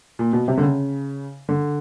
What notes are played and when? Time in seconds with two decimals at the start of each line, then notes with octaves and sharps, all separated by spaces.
0.19 A#2
0.33 B2
0.48 C3
0.57 D3
0.62 C#3
1.49 D3